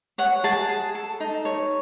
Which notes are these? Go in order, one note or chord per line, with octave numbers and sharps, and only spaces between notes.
C#5 F#5
G#4 A5
G#4
A4
D#4
C#5